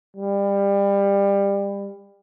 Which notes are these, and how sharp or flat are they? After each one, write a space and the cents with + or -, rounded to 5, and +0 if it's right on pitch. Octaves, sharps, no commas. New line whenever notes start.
G3 +25